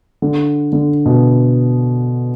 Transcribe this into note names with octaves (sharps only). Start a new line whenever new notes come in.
D3
D3
B2